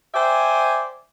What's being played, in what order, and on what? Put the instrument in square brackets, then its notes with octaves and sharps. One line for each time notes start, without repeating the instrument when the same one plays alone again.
[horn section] C5 D5 E5 G5 G#5